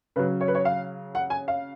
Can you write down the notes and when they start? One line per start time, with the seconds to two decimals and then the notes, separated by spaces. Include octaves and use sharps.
0.16 C#3 F#3 B4
0.41 C#5
0.48 B4
0.55 C#5
0.65 F5
1.15 F#5
1.30 G#5
1.48 F5